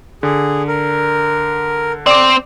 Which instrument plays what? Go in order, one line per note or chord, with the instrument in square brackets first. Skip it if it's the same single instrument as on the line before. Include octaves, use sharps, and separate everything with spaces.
[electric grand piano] D3 [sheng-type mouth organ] G#4
[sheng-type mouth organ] A#4
[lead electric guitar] C4 [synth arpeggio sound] D5 D6